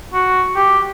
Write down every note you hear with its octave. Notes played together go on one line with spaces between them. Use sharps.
F#4
G4